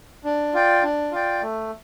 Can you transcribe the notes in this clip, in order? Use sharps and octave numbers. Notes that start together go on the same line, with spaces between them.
D4
F4 D5 G5
D4
F4 D5 G5
A3